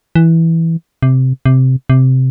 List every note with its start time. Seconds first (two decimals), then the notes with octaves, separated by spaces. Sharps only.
0.15 E3
1.02 C3
1.46 C3
1.90 C3